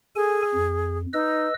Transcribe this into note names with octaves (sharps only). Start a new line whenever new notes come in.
G#4 A4 G#5
F2
D#4 B4 D#5 E6